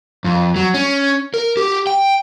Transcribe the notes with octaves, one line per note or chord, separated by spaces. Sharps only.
F2
F#3
C#4
A#4
G4
G5